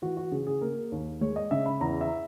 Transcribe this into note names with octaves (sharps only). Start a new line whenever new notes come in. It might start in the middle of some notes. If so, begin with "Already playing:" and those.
E3 F#4
F#4
C#3 G#4
G#4
A#3 A#4
D#2
G#3 C#5
D#5
C#3 E5
B5
E2 A#5
E5